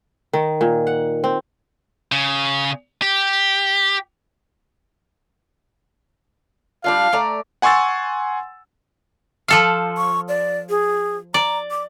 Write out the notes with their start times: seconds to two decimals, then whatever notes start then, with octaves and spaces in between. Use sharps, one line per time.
0.33 D#3
0.61 A#2
0.87 F#5
1.24 C4
2.12 C#3
3.02 G4
6.84 G3 D4 F4 F5
7.13 A3 D5 A#5
7.62 F#5 G#5 C6 C#6 E6 A6
9.48 F3 A4 F5
9.97 C#6
10.29 D5
10.70 G#4
11.34 D5 A#5
11.71 D6